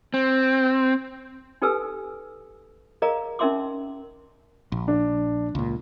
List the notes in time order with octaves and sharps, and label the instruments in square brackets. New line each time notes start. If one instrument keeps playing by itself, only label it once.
[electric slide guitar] C4
[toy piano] D#4 G4 A4 B4 G#5 E6
G#4 A#4 D5 D#5 F5 A#5
C#4 D#4 A#4 E5 C6 D6
[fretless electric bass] A#1
[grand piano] D4
[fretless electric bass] C#2 A#2